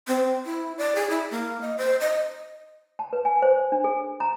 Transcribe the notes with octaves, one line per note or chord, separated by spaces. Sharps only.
C4
E4
D5
G#4
E4
A#3
D#5
C5
D#5
A5
B4
G#5
C5
D4
G#4
A#5